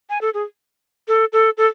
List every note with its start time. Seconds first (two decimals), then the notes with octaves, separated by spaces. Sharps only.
0.10 G#5
0.21 A4
0.34 G#4
1.08 A4
1.33 A4
1.58 A4